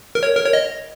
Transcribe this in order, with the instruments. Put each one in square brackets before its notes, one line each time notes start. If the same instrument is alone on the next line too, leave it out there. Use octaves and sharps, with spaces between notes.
[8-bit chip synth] A#4
C#5
A#4
C#5
D#5